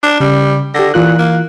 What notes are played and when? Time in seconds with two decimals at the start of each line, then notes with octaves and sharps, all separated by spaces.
0.03 D4 D6
0.20 C#3 G3
0.75 D3 G4 A#6
0.94 A#2 E3 F4 F#6
1.18 A#3